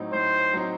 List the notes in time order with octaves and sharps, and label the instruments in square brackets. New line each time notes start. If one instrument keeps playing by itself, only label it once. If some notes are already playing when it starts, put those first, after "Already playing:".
Already playing: [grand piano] A2 F#3 C4 D#4
[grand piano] A2 [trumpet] C5
[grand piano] F#3 C4 D#4